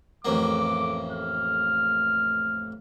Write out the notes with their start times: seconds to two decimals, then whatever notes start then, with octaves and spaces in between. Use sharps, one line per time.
0.25 A1 F2 A#3 D6
1.12 F6